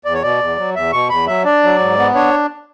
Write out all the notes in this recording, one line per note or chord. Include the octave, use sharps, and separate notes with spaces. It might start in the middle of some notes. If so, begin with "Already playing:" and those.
E2 D5
C#5
B2 D5
E2
F#3
E2 E5
B2 C#6
E2 B5
F#3 E5
D4 D5
F#3
G#2
B3
D4 C#5